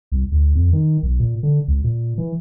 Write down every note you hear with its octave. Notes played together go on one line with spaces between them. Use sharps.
C2
D2
F2
D#3
B1
A#2
D3
C#2
A#2
E3